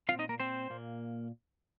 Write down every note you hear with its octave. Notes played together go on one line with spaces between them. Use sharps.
A#2 F3 C4 F4 F5
D#4 D#5
A#3 A#4
C4 C5
A#2 A#3